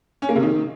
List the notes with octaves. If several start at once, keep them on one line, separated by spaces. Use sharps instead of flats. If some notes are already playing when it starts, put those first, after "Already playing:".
C#4
A#3
C3
D#3